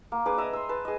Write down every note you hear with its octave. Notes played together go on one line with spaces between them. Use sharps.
A#3
D4 G#4 B4 D6
D#5 E5 A#5 D#6
C6 E6
B4 A5
G#4 D#5